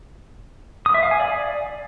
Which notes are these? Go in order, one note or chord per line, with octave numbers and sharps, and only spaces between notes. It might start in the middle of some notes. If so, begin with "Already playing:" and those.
D#6
E5
F5
G#5
D5